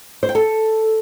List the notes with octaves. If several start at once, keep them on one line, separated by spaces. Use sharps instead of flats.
C5
G5
A4